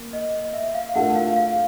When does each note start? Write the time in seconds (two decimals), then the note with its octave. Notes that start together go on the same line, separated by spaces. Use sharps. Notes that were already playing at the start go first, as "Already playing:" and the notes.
Already playing: A#3
0.13 D#5
0.53 E5
0.74 F5
0.95 A3 D4 F4 A#4 F#5
1.16 F5
1.36 F5